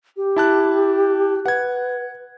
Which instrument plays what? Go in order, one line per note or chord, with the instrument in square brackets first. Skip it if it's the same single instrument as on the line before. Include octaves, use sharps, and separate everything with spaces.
[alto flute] G4
[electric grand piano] E4 A5 F#6
[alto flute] B4 [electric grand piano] F#5 G#6